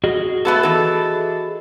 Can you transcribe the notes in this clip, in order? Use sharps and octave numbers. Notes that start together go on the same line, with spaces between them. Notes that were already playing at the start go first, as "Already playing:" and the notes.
F#4 G#4 D#5
A3 B3 A4
E3 A4